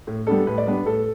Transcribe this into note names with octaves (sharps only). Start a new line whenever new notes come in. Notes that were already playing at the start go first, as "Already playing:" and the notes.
A2
G3 B3 D4 A4
A2 B4
D5
G3 B3 D4 B4
A2 A4